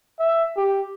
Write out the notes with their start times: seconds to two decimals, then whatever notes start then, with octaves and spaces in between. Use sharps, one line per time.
0.20 E5
0.57 G4